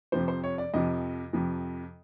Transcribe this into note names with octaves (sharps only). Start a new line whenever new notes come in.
F2 C3 F3 C5
C5
C#5
D5
F2 C3 F3 D#5
F2 C3 F3